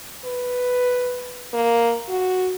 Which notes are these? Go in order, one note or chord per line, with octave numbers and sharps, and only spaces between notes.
B4
A#3
F#4